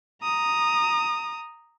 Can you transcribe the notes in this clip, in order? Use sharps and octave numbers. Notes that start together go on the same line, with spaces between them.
A#5 D#6